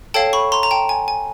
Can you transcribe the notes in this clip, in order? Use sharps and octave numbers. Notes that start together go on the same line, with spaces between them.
A4 C#5 F5 G5 A5
B5 C#6
A#5 C6
A#5
G5 A5
G#5
G#5